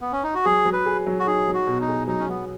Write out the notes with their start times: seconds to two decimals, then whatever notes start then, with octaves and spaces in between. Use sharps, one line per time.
0.01 B3
0.12 C#4
0.23 D#4
0.34 F#4
0.45 F#3 G#4
0.65 F#3
0.73 B4
0.86 G#4
1.06 F#3
1.19 F#4
1.26 D#4 G#4
1.48 F#3
1.54 F#4
1.67 B2
1.81 D#4
1.88 G#4
2.07 F#3 D#4
2.19 C#4
2.28 F#3 B3